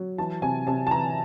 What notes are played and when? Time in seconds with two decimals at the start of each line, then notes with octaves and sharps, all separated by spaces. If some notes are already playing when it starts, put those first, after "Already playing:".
Already playing: F#3
0.18 E3 A5
0.42 C3 G#5
0.67 C3 A5
0.87 A5
0.91 E3 A#5